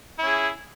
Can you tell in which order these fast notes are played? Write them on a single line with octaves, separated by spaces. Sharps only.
E4 C#4 G#4